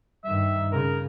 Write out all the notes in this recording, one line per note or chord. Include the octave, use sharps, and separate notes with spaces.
G2 D#3 E5
C#3 A#4